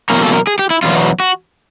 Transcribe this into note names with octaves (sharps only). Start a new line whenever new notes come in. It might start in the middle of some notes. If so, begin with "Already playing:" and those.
E2 B2 F#3 A#3 C#4 A#4
A4
A#4
G#4
G4
E4
E2 B2 F#3 F4
F#4